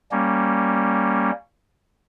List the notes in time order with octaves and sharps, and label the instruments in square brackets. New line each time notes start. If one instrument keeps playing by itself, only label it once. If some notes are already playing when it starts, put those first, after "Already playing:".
[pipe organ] G3 A#3 C#4